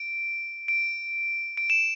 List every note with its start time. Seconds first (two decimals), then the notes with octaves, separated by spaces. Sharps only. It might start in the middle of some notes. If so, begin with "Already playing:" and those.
Already playing: D7
0.68 D7
1.57 D7
1.70 E7